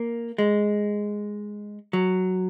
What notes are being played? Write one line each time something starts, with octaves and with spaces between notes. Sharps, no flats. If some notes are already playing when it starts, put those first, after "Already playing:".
Already playing: A#3
G#3
F#3